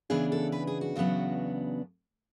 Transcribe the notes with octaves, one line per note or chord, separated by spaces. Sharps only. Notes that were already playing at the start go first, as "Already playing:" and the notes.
C#3 E3 B3 D4 G#4
A4
B4
G#4
F#4
E2 C#3 F#3 B3 D4